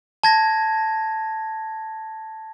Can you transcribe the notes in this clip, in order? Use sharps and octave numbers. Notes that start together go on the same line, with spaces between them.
A5 G#6 A#6